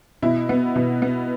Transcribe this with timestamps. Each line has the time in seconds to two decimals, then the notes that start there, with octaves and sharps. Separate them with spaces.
0.22 B2 E4
0.49 B3
0.76 B2
1.02 B3